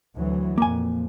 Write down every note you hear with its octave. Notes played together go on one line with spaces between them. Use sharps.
D2 E3 F#3
F2 A#2 A#3 G#5